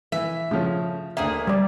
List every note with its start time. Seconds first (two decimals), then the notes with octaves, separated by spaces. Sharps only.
0.12 E3 E5
0.51 C#3 F3 A3 C#4
1.17 D2 A#3 G#4 E5
1.47 G3 D5